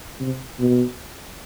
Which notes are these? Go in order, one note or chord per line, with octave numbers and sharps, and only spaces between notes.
C3
B2